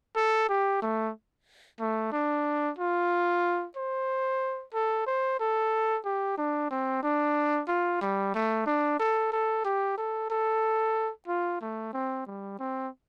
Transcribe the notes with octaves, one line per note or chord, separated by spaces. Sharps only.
A4
G4
A3
A3
D4
F4
C5
A4
C5
A4
G4
D4
C4
D4
F4
G3
A3
D4
A4
A4
G4
A4
A4
F4
A3
C4
G3
C4